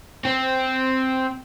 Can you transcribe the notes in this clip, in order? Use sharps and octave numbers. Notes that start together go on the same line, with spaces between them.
C4